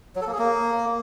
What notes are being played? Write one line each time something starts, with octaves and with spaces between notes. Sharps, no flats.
F#3
A4
A#3
G#4
A#3